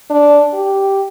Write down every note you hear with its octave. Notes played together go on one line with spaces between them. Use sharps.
D4
G4